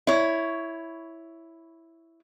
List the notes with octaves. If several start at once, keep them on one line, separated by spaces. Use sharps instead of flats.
E4 C#5